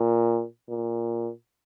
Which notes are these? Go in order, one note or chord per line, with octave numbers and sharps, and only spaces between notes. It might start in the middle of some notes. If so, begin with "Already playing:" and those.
Already playing: A#2
A#2